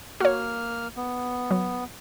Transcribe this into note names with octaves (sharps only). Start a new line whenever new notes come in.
A#3 F#4 C#5 F6
B3
F#3